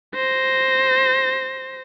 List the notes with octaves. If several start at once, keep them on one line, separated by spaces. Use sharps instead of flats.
C5 A#6